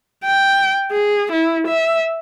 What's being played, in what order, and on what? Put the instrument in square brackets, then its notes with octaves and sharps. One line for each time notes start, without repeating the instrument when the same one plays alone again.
[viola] G5
G#4
E4
E5